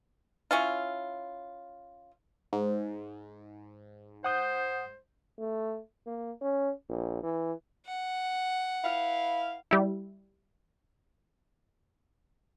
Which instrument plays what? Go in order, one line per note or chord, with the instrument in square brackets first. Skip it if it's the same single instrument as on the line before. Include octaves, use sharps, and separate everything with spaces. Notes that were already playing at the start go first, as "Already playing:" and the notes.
[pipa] C#4 E4 F4
[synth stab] G#2
[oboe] C5 [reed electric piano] F#5 D#6 G6
[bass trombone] A3
A#3
C#4
A#1
E3
[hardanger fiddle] F#5
[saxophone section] E4 B4 F5
[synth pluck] G3 E4